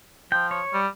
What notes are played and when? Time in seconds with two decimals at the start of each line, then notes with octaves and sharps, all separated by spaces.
0.32 F3 G5
0.51 C#5
0.73 G3